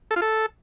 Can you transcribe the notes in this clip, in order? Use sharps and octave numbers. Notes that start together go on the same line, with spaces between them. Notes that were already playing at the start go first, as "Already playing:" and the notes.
A4
F4
A4